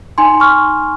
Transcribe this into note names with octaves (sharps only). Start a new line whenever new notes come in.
D#4 G#5 C6
C#6 F6